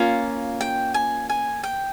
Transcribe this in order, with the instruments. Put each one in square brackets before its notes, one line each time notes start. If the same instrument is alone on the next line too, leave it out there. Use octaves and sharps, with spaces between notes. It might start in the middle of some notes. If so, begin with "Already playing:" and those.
Already playing: [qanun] A#3 C#4 F4 [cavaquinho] F5
[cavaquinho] G5
G#5
G#5
G5